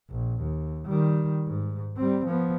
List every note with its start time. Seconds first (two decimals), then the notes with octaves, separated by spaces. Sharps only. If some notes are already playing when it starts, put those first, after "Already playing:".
0.11 A#1
0.41 D#2
0.86 D#3 G3
1.47 G#2
1.97 G3 C4
2.26 F3 B3